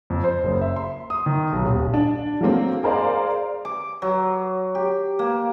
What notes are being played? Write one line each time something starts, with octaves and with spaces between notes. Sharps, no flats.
F2
C5
F#1
E5
C6
D#6
D#3
B1
D#1
D4
F#3 A3 A#3 C4
G#4 A#4 C5 D5 F5
D6
F#3
G4
A#3